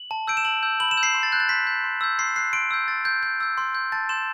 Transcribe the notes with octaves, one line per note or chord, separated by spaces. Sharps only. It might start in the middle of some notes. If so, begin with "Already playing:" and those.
Already playing: F#7
A5
E6 G6 D7
E7
A5 F#7
E6 G6
B5 F#7
E7
E6 G6
C7
C6
A6
F#6 G6
A6
C6 B6
G6
C6
E6 G6
C6 C7
F#6 C7
C6 D7
E6 G6
C6 A6
G6
C6 G6
E6 G6
C6
G6
A5 A6
C6 G6 E7